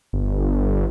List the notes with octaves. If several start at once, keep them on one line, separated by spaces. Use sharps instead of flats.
G1